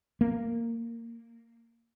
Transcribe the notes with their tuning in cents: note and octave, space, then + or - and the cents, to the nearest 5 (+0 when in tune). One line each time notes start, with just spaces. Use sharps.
A#3 -15